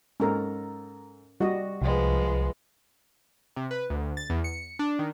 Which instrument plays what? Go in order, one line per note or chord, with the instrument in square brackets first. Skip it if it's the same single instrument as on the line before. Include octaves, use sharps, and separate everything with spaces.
[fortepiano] G#2 A4 A#5 [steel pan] C#4 A#4
[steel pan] G3 D#5 [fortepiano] F#4
[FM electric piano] C2 [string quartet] F3 G#3 B3
[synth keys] C3
B4
D2
A6
E2
C#7
D4
D#3